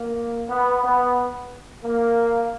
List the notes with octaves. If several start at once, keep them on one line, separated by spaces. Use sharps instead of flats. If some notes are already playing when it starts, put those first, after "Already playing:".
Already playing: A#3
B3
B3
A#3